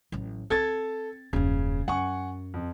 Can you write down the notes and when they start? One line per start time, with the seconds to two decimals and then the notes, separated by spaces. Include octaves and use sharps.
0.12 A1 F#3
0.50 C4 A4 G#6 A6
1.33 D#1 F#2 C#3
1.88 F#2 F#5 G#5 C#6
2.54 F2